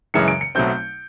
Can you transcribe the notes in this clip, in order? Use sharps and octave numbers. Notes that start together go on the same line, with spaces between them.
F#2 C#3 E3 G#3 C#7
D7
C#7
B1 B2 F#3 A3 C4 G6